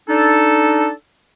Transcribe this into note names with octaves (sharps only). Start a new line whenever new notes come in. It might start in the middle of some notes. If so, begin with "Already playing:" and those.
D4 D#4 A4